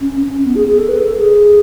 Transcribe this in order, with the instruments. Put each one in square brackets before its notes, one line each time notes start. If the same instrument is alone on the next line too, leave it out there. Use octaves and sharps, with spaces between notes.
[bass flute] C#4
C#4
B3
G#4
G#4
A4
B4
A4
G#4